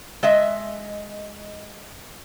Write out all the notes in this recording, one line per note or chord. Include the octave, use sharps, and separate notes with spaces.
G#3 D#5 E5